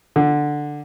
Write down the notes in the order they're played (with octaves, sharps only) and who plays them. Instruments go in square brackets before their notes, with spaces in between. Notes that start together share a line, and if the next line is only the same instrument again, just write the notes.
[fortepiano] D3